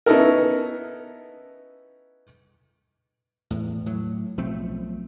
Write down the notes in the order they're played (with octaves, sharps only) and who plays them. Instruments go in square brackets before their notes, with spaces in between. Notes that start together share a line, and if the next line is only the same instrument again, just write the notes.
[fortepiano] B3 C#4 D#4 E4 A4 A#4
[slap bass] E2 A2
A2 F#3
B1 F3 A3 C4